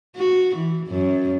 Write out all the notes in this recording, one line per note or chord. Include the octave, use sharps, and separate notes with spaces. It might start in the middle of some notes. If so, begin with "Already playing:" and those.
F#4
E3
F#2